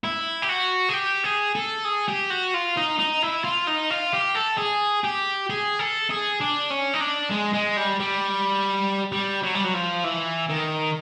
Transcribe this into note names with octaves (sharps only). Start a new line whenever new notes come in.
E4
G4
F#4
G#4
G4
G#4
A4
G#4
G4
F#4
F4
D#4
D#4
E4
F4
D#4
F4
G4
A4
G#4
G4
G#4
A4
G#4
D4
C#4
D#4
D4
G#3
G#3
G3
G3
G3
F#3
G3
F#3
F3
E3
D#3